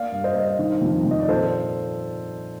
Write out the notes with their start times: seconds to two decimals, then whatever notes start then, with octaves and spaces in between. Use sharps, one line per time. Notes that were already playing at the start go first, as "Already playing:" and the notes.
Already playing: A#3 D5 F5
0.12 G2
0.24 C5 D#5
0.35 G2
0.59 D#3
0.82 F2
1.06 F2
1.11 D#5
1.20 D5
1.28 A#2 A4 C5